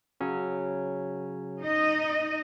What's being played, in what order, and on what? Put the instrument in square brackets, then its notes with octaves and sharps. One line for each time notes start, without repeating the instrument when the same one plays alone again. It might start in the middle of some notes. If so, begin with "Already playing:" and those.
[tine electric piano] C#3 F#3 C#4
[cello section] D#4 D#5